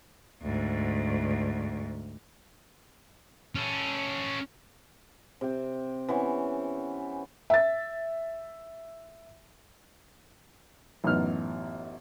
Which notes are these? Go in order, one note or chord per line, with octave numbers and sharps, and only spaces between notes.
D2 G#2
C#4 A4
C3 G4
E3 B3 C#4 C#6
E5 A6
A1 F#2 B3 D#4 F6